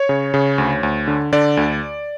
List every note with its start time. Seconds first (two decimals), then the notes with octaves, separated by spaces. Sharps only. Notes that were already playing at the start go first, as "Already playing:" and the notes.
Already playing: C#5
0.09 C#3
0.34 C#3
0.58 D2
0.83 D2
1.08 D3
1.32 D3 D5
1.57 D2